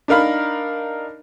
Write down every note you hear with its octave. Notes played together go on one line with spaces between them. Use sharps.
D4 D#4 A#4 F5 B5